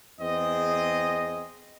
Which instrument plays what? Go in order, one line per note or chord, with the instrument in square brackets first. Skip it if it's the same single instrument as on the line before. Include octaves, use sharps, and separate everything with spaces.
[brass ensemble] E2 C4 G#4 D#5